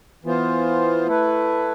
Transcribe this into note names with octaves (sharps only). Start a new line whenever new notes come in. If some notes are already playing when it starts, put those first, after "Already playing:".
E3 B3 F4 C5
A3 E4 B4